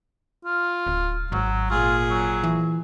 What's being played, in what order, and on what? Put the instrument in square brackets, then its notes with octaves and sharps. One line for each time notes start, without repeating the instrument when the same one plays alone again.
[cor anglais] F4
[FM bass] D1
[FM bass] G#1 [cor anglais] F#3
[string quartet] A#2 G#4 [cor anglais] F4
[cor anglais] F#3
[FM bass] E3